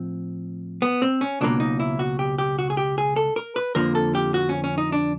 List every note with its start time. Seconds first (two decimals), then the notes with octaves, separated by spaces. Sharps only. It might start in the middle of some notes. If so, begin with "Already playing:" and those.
Already playing: A2 F3 C4
0.82 B3
1.02 C4
1.21 C#4
1.41 C#2 B2 F#3 A#3 D4
1.60 D#4
1.80 E4
1.99 F#4
2.19 G4
2.38 G4
2.59 F#4
2.70 G#4
2.77 G4
2.98 G#4
3.16 A4
3.36 A#4
3.56 B4
3.75 F2 D3 F3 A#3 A#4
3.95 A4
4.15 G4
4.34 F#4
4.49 C#4
4.64 C#4
4.78 D#4
4.92 D4